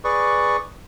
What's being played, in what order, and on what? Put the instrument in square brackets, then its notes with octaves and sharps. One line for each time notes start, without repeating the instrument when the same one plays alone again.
[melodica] G#4 B4 D5 C#6